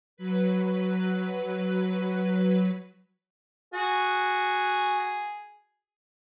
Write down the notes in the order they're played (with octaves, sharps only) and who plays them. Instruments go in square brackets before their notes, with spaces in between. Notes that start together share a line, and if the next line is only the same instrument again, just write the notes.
[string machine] F#3 B4
[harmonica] F#4 G#4